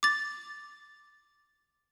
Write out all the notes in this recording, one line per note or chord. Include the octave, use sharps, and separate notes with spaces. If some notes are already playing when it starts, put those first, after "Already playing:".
D6 A6